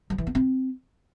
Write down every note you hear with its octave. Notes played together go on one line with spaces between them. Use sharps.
F#3
E3
B3
C4